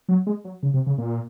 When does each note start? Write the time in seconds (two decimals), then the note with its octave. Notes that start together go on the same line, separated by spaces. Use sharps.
0.09 F#3
0.27 G#3
0.45 F#3
0.63 C#3
0.74 C3
0.87 C#3
0.98 A#2